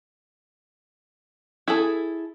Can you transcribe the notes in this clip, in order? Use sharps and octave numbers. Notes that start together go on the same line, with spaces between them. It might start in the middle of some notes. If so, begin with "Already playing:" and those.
E4 G#4 A4